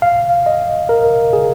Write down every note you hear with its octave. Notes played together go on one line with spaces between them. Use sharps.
F5
D#5
A#4
G#4